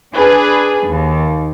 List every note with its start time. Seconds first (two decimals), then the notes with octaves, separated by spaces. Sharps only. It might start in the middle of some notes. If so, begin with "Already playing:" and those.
0.15 D4 G#4 B4
0.86 D#2